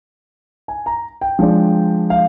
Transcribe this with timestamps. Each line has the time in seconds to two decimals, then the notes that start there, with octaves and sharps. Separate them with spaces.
0.68 G#5
0.86 A#5
1.21 G5
1.39 F3 G#3 D4
2.10 F5